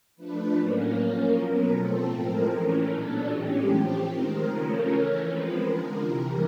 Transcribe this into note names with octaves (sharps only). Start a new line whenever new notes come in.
F3 A3 D4 B4
A2 F#3 A#3 C#4 A#4
F3 A#3 C#4
B2 F#3 B3
F3 A3 C4 A4
A2 F3 G#3 C4 A#4
E3 A3 C#4
A#2 F#3 B3 D4 A4
A2 E3 G#3 C#4 G4
F3 A3 C4
D#3 G#3 C4 A#4
C#3 F3 A3 C#4
E3 A3 C#4 A#4
F3 G#3 C4 B4
D3 F3 G#3 A#4
C3 E3 G3